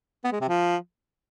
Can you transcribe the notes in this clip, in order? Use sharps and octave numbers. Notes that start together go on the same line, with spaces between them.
B3
G#3
C3
F3